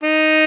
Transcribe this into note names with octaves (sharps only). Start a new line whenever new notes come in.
D#4